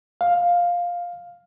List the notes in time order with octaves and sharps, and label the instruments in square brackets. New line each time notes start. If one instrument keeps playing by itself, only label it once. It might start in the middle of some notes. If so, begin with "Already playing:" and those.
[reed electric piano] F5